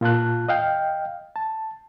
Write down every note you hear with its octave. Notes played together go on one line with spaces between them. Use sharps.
A#2 F4 A5 F#6
D#5 F5 G5
A5